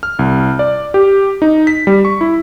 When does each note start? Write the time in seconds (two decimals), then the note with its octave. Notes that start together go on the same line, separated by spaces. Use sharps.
0.03 F6
0.19 C2
0.59 D5
0.94 G4
1.42 D#4
1.67 B6
1.87 G3
2.05 C#6
2.21 E4